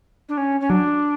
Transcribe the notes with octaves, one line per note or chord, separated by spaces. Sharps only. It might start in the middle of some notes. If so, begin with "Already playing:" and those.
D4
C#4
C#4
F#3 D4